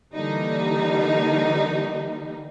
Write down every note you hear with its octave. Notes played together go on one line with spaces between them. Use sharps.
D3 E3 G3 A#3 D#4